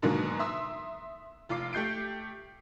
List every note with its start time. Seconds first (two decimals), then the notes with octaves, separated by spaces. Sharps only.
0.02 G#2 B2 D3 D#3 F#3 A#3
0.39 E5 C6 D#6 E6
1.49 F1 F4 D6 C7
1.73 A3 G4 G6 C7 D7